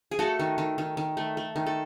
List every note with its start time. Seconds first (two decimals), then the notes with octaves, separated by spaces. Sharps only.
0.11 G#4
0.19 A3 F#4 A4
0.40 D#3
0.58 D#3
0.78 D#3
0.97 D#3
1.17 A3
1.37 A3
1.56 D#3
1.66 A4